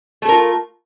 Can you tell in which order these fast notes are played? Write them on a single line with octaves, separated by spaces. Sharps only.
A3 A4 A#4 F4